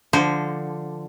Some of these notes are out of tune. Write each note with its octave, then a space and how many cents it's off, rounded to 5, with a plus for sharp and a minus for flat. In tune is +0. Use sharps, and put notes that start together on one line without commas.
D3 +0 F3 +0 C5 -20